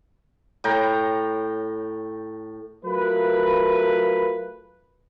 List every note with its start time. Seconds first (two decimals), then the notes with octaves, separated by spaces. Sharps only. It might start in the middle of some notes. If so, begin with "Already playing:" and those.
0.64 A2 G5 A#5
2.84 F#3 A3 F4 A#4 B4